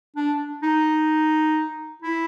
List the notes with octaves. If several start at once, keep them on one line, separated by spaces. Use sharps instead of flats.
D4
D#4
E4